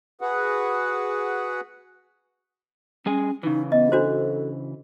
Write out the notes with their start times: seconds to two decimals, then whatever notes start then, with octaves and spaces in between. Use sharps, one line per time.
0.21 F#4 G#4 B4 F#5
3.06 G3 C#4 G#4 G#5
3.43 C#3 E3 D#4
3.72 B3 D#5
3.92 D4 F#4 A4 C5